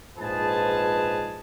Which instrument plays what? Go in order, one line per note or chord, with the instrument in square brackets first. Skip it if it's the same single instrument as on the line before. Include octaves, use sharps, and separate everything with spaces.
[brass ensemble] A#1 G#2 F3 G#4 B4 A5